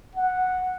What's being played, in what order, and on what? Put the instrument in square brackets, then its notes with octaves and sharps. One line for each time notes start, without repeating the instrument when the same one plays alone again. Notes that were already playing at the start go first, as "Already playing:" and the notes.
[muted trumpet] F#5